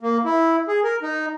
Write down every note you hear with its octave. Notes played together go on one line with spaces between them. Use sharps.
A#3
E4
G#4
A#4
D#4